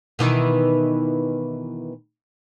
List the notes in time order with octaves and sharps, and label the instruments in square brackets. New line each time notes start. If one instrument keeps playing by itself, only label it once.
[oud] B2 D#3 E3